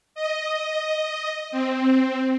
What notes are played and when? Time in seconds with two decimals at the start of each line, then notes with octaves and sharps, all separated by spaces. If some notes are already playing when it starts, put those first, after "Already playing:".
0.15 D#5
1.51 C4